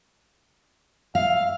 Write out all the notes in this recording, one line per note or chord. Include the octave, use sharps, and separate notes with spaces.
E5 F5